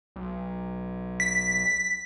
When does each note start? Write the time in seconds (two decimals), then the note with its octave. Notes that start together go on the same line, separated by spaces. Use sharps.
0.16 B1
1.20 B6